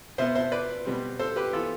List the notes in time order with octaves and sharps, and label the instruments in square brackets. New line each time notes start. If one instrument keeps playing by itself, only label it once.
[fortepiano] B2 B3 C5 E5
C5 E5
B4 D5
B2 G3 C4
A4 C5
G4 B4
E3 B3 F4 A4